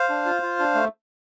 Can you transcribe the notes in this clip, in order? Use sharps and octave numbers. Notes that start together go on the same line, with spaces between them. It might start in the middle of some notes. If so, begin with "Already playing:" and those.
Already playing: C5 F5
D4
F4
F4
D4
A3